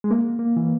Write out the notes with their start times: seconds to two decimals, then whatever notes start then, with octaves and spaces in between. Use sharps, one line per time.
0.04 G#3
0.11 A#3
0.39 A#3
0.57 E3